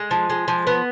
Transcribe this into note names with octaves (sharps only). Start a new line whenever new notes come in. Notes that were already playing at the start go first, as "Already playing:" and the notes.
Already playing: G#3
F3
G#3
F3
B3